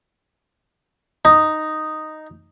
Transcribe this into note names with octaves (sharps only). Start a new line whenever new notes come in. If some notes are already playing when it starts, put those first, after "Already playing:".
D#4